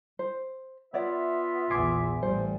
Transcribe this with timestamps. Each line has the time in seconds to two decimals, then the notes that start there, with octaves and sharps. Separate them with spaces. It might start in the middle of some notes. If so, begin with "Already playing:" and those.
0.19 C5
0.94 B3 F4 C#5 D5 E5 F#5
1.70 A#1 E2 G#5 C6 D6
2.23 A1 G3 C5